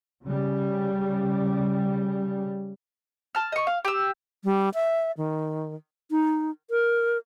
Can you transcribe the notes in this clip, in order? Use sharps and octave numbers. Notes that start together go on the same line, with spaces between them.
C#3 G3
A5 F6
D#5 C#6
F5
G4 E6
G3
E5
D#3
D#4
A#4